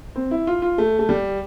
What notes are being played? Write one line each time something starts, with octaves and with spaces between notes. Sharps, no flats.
C4
E4
F4
F4
A3
A3
G3